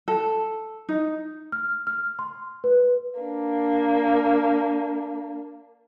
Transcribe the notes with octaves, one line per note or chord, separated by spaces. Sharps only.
A4
D#4
F6
F6
C6
B4
A#3 D4